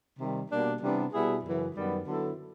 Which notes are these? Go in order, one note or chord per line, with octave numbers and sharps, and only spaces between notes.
C3 D#3 G3
B2 G3 A#3 D4 G4
C3 E3 G3 B3 D4
B2 G3 B3 E4 G#4
F#2 C#3 E3
F#2 D#3 G3 B3
D3 F#3 B3 E4 A4